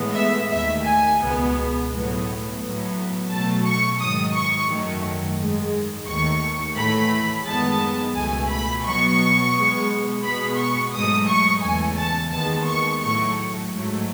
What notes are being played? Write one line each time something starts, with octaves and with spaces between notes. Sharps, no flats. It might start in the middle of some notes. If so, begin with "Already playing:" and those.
Already playing: A2 E3 G#3 B3
E5
D#2 D#3 A3 E5
G#5
C#2 B2 G#3 B3
A2 F#3 B3
A2 F#3 B3
B2 F#3 A3 A5
C#6
G#2 D#3 F#3 D#6
C#6
F#2 D#3 F#3 A3
G#2 D#3 G#3
D#2 D#3 A3 C#6
A2 E3 A3 B5
F#2 D#3 G#3 B3 A5
C#2 B2 A3 G#5
B5
B2 F#3 B3 C#6
B2 G#3 B3
B2 G#3 B3 B5
C#6
G#2 F#3 A3 D#6
C#6
E2 C#3 E3 A3 G#5
A5
D#2 D#3 G#3 B3 A5
C#6
A2 F#3 A3 C#6
G#2 F#3 A3